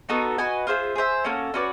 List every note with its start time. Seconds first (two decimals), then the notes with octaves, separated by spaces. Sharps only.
0.09 B3 D#4 F#4 A4
0.38 F#4 B4 D#5 G#5
0.67 F4 G#4 C5 E5
0.95 G#4 C5 E5
1.24 A#3 C#4 F#4 A4
1.54 C#4 F#4 B4 D5